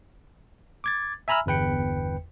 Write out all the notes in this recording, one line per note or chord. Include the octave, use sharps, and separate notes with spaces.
D6 G#6 A6
E5 G#5 A#5 B5 E6 F6
G1 E2 B4 G5 C#7